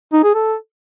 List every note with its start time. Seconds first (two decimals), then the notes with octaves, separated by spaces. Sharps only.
0.13 D#4
0.24 G#4
0.35 A4